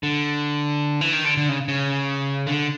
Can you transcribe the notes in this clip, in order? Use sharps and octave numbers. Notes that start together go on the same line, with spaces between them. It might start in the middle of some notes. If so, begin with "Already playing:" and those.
D3
E3
D#3
D3
D3
C#3
C#3
D3